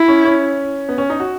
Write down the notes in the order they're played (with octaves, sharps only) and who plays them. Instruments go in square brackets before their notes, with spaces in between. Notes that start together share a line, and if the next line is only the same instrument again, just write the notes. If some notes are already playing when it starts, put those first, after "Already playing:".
Already playing: [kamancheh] E4
[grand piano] C#4
C#4
B3
C#4
D#4
F#4